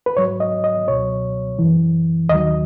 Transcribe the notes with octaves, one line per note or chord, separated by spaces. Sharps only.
B4
G#2 F#3 C#5
D#5
D#5
C#2 B2 F#3 C#5
F#2 E3
D#2 D#3 F#3 D#5